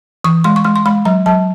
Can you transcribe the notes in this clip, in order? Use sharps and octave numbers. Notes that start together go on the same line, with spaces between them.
E3 C#6
G#3 C6
C#6
G#3 C6
C6
G#3 B5
F#3 A#5
F#3 A5